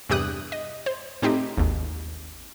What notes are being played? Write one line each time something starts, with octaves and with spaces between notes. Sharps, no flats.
E2 G2 C3 G4 D#6 F#6
D#5
C5
A2 C4 D#4 G4
G#1 D#2